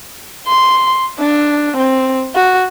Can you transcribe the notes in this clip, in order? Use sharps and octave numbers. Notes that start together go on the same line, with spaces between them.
C6
D4
C4
F#4